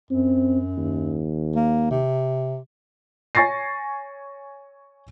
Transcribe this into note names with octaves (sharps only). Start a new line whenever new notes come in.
F#2 C4
D#2
A#3
C3
C#5 G#5 C#6 A6 A#6 C7